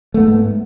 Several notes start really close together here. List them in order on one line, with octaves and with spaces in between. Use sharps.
A3 B3 G#2